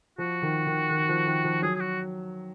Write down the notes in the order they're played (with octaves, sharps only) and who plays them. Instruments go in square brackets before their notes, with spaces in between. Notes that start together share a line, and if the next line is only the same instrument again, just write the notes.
[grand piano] F3 [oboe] F#4
[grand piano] D#3
D#3
D#3
F3
D#3
F3
[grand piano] F#3 [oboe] G#4
[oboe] G#4
F#4